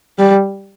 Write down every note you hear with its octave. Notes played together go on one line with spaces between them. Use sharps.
G3